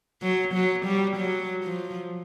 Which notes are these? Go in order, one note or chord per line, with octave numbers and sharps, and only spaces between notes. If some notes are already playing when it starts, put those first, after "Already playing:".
F#3
F#3
G3
F#3
F3